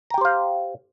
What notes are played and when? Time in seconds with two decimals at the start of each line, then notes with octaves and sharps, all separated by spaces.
0.10 A#5
0.14 G5
0.18 G4
0.21 C5
0.25 F5